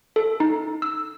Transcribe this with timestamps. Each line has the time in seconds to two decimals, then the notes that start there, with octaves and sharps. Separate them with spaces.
0.16 A4
0.40 D#4
0.82 E6